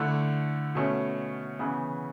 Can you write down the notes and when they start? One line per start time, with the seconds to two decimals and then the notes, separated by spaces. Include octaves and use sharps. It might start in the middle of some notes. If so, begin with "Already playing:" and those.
Already playing: D3 A3 E4
0.75 B2 A3 C#4
1.59 C#3 E3 B3